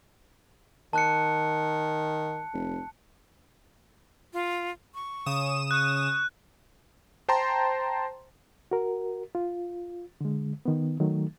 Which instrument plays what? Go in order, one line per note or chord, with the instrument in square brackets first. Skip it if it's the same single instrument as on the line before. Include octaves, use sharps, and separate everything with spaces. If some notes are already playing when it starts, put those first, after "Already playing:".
[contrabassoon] D#3 [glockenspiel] A5 F#6 C#7
[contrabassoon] F1
[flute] F4
C#6
[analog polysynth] C#3 D#6 E7
[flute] C#6 [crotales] F#6
[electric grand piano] C5 G5 A5 A#5 C6
[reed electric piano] F#4 A#4
F4
D3 G#3
D#3 B3
D#3 F#3 A3